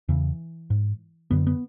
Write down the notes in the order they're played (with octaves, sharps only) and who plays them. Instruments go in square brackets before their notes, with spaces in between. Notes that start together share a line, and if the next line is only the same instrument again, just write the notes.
[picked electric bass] E2 C#3 E3
G#2
F#2 D3 B3
B3